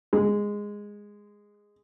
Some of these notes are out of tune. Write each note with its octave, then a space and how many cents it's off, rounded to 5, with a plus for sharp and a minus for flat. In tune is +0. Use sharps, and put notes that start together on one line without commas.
G#3 -10